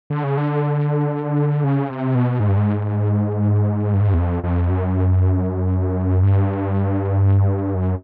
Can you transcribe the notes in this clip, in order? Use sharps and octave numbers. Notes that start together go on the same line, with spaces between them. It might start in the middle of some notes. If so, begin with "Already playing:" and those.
D3
C#3
D3
C#3
C3
B2
G#2
G2
G#2
G2
G#2
G2
E2
F2
F2
F#2
G2
F#2